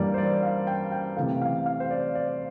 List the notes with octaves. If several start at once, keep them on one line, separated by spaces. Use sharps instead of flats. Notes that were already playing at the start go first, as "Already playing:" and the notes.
Already playing: G2 E3 G3 A#3 D5
C5
D5
F5
G5
G5
C3 E3 A3 F5
F5
F5
C5
D5
D5